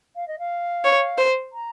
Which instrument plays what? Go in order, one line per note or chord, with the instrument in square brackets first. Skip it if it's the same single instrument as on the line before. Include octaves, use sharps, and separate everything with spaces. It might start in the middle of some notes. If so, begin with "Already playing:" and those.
[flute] F5
D#5
F5
[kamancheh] C#5
C5
[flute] A#5